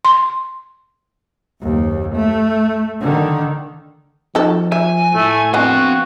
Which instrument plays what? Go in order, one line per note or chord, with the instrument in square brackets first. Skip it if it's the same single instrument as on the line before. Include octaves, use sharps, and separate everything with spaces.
[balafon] C6
[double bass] F#1 D#2
A3
D3 D#3
[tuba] F3 [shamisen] D#4 F#4 A4
[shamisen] E5 [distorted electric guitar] G#5
[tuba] A2 [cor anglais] A3
[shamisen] D3 B3 [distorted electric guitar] C4 F5 [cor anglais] F#4